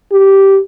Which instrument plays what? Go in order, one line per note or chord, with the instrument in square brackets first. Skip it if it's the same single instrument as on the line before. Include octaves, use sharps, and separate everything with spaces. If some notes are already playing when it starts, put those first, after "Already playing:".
[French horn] G4